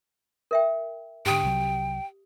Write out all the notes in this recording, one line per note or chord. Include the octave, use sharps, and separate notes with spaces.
A#4 E5 G5
G#2 D3 G4 G5 D#6
C2 C3 F#3